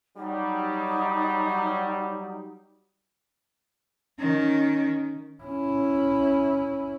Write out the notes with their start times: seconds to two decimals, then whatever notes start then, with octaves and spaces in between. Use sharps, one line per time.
0.16 F#3 G3 D#4
4.19 D#3 C#4
5.43 C#4 E4